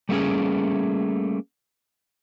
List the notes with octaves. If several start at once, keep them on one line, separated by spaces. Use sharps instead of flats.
G3 A3 A#3 C#4 G#4